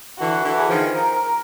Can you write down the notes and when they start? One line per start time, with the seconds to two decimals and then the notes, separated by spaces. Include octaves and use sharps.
0.18 D3 E3 F#4
0.44 D3 E3
0.57 G#4
0.69 D#3 F3
0.95 A#4